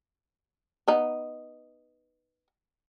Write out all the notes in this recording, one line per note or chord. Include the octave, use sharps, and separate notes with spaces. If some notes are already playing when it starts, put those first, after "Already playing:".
B3 D#4